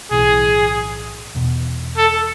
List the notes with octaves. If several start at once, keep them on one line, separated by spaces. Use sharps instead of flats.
B1 A2 E3 G#4
E1 E2 B2
A4